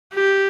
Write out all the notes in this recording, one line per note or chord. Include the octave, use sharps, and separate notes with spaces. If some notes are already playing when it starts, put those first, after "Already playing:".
G4